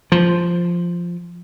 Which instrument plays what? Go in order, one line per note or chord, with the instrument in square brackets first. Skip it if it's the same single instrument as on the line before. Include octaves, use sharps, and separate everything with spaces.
[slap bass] F3